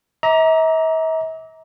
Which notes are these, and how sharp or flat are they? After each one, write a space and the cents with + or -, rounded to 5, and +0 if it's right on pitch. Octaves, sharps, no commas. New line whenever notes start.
E5 -45 A#5 +10 D6 -15